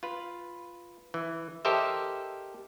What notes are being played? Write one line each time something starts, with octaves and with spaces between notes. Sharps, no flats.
F4 B4
E3
G4 A4 A#4 C5 D#5 E5